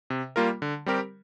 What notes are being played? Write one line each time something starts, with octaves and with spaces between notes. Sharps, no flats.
C3
G3 A#3 F4 A#4
D3
G3 C4 G4 A#4